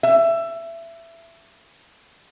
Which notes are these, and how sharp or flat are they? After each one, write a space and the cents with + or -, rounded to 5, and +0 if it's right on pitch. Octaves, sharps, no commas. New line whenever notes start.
E5 +20